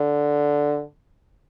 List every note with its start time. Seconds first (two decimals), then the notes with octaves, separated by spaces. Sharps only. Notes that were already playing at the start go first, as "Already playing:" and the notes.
Already playing: D3